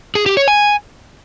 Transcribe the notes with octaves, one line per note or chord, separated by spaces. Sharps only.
G#4
G4
C#5
G#5